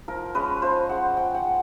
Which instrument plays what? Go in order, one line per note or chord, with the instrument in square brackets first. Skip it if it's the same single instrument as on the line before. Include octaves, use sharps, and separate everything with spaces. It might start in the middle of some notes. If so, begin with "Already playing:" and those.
[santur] F3 A#4
G#3 C#4 B4
F3 C5
G#3 C#4 F#5
F3 G5
F#5
G#3